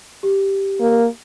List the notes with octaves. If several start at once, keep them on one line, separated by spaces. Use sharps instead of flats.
G4
A#3